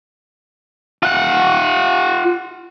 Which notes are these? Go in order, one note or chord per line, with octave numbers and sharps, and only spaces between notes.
F4 F#5